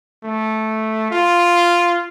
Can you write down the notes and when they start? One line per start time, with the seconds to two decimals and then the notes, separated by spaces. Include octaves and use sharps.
0.24 A3
1.11 F4